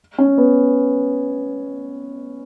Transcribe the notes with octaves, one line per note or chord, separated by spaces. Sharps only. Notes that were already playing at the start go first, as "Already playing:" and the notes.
C#4
B3